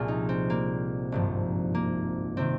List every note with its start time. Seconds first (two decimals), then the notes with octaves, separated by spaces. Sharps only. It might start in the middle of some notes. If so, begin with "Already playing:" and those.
Already playing: C2 A#2 F3 F4 G#4
0.08 D#4
0.29 C4
0.50 A#3
1.12 G#1 G2 F3
1.75 A#3
2.37 C3 D#3 C4